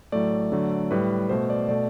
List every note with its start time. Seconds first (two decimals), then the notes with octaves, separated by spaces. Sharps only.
0.12 A2 F#3 A3 D5
0.52 D3 F#3 A3
0.91 A2 G3 B4
1.29 B2 A3 C5
1.50 D5
1.68 B2 A3 D5